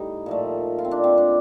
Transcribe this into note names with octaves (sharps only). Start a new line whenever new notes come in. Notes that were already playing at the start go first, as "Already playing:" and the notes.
Already playing: A2 G3 D#4
A#2 F3 A3
F4
C4
D4
C4
D4